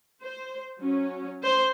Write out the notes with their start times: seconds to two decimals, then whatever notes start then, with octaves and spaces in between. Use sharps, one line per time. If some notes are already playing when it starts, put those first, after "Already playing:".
0.23 C5
0.83 F#3 C#4
1.43 C5